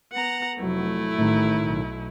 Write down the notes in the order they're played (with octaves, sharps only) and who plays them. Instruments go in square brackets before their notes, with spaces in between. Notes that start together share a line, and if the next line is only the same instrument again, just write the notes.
[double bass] B3 [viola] F#5 A#5
[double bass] F1 F#3 [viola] A3 E4
[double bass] A1 [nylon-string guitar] A2 D#3
[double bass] B1